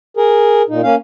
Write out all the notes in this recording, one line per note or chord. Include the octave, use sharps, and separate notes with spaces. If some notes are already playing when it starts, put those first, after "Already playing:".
G#4 A#4
A#2 D#4
A#3 C#4 F5